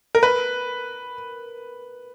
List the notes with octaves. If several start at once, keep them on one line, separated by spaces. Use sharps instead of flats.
A#4
B4